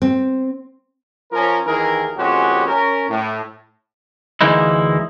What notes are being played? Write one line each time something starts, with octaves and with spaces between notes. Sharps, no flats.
C4
F3 C#4 A#4
D#2 E3 D#4 G#4 A#4
F2 A#2 G#3 C#4 F#4 G4
C#4 A#4
A2
D2 E3 G#3 A#3 D#4 E4